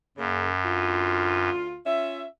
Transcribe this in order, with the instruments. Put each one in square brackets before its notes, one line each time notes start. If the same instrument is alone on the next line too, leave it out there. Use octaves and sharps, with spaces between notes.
[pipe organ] F#2 [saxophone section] C#3 A#3
[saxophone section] D2 F4
C#4 F4 E5